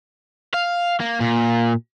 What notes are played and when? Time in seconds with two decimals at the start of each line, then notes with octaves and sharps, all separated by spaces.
0.54 F5
1.00 A#3
1.21 A#2